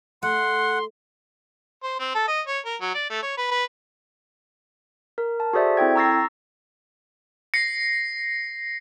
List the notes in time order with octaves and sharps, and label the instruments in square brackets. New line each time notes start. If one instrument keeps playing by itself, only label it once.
[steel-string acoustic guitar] A3 [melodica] F#5 [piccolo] C6
[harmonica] C5
C4
A4
D#5
C#5
A#4
F#3
D5
A3
C#5
B4
B4
[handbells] A#4
A5
F#4 G#4 A4 C5 D5 E5
C4 E4 A4 G5 G#6
A#5 C#6 E6 A6 A#6 C7
[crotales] A#6 C7 C#7